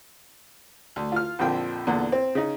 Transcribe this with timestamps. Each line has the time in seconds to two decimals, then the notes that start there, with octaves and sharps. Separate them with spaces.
0.96 D2
1.12 F4 F6
1.39 A#1 F2 D3 F3 G5
1.87 E2 A#2 D3
2.12 C4
2.35 C#3 D#4